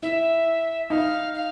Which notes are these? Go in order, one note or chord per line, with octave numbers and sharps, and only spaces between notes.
E4 E5
D#4 F5
F5